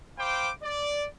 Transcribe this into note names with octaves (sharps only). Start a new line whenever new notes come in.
C5 F5 G5 B5 D6
D5